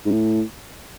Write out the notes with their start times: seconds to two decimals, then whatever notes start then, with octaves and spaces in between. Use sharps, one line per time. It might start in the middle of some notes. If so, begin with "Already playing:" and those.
0.06 G#2
0.11 A2